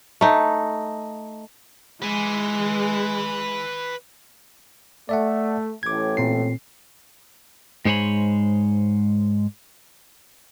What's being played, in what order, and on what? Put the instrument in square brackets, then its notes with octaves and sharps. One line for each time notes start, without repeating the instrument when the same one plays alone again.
[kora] A3 D#4
[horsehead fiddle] G#3 [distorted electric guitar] B4 G#5
[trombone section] A3 [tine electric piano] D5 E5 F#5
[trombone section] A1 A2 [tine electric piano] D6 G#6
[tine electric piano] A#2 C4 C7
[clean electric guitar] G#2 G#3 C5 C#5 G#5 B5